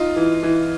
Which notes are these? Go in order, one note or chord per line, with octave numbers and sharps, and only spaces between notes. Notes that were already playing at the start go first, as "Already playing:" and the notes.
Already playing: D#4 F4
E3
E3